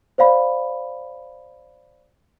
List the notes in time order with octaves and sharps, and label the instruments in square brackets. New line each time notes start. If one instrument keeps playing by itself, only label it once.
[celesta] C5 D5 F5 B5